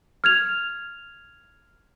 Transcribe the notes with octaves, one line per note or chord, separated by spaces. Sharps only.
F6 G#6 F7